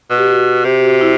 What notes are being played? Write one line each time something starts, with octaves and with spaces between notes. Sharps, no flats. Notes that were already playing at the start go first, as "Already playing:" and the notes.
B2
G4
F#4
C3 G4
G4
F#4
E4